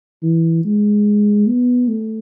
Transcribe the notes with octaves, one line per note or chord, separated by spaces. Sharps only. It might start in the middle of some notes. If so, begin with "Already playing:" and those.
E3
G#3
B3
A3